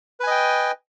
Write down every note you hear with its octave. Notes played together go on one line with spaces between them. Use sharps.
B4 D#5 G5 G#5